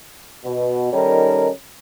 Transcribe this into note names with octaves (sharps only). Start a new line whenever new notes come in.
B2
D#3 G3 C#4 D#4 A4 A#4